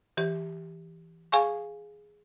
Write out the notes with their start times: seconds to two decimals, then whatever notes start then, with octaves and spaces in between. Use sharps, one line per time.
0.17 E3 G4
1.32 G#4 F5 G#5 C#6